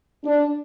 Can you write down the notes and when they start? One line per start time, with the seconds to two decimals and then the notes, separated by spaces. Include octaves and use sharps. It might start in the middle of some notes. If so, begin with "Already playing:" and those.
0.25 D4